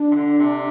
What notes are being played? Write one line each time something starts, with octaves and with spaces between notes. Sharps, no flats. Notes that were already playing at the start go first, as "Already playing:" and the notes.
Already playing: D4
C3
D3
C3